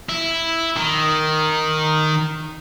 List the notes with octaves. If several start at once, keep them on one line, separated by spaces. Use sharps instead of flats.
E4
D#3